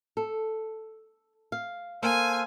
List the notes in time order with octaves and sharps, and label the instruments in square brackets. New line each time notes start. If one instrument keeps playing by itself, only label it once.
[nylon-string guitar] A4
F5
[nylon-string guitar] A#3 [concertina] A4 C5 F5 [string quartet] G#5